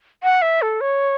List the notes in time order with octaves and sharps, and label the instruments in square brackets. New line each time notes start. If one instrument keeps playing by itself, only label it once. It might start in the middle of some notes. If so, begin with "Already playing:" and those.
[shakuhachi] F#5
E5
A4
C#5